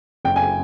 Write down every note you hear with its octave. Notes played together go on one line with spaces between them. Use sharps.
F#1 G5
G#5